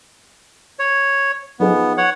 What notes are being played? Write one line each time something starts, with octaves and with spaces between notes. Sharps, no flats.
C#5
F3 B3 D#4 G#4
C#5 F#5